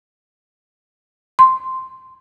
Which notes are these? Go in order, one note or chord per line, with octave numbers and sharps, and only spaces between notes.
C6